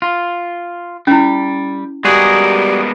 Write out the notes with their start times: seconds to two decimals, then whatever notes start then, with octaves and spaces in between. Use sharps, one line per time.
0.02 F4
1.07 G3 C#4 E4
2.05 G3 G#3 B3 F#4 G#4 A#4